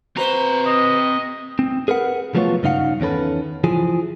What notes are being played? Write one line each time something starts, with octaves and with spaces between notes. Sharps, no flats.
C4 F#4 B4 C5 A#5
D#5
C4
G#4 A#4 B4 F#5
F3 F#3 A3 B3 F4 C#5
G2 C#3 D#4 F5 F#5
E2 D#3 C#4 A4 B4
E3 F3 G#4